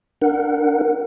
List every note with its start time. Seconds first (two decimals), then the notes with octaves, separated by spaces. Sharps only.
0.22 D4 A#4 F#5